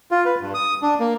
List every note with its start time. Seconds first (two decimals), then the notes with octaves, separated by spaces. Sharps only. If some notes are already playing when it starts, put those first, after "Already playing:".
0.11 F4
0.25 B4
0.41 G2
0.54 D#6
0.82 D4
1.00 A#3